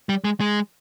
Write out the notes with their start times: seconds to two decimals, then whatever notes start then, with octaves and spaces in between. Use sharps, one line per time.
0.09 G3
0.24 G#3
0.41 G#3